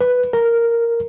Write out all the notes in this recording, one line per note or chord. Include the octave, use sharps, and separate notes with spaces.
B4
A#4